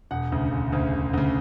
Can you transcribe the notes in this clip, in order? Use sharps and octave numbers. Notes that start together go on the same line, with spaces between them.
E1 F#5
D2 C#3
E1
D2 C#3
E1
D2 C#3